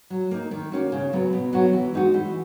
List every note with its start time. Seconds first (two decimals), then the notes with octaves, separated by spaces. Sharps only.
0.10 F#3
0.31 A#3 D#4
0.51 D#3
0.72 A#3 C#4 F#4
0.92 C#3
1.13 F#3 B3
1.33 B2
1.53 F#3 B3 F#4
1.73 E3
1.94 G#3 D#4 F#4
2.14 E3